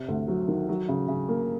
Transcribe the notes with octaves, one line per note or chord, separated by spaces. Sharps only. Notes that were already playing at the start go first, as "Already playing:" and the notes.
Already playing: C3
D2
F#3
D#3
F#3
C#3
C#3
A#3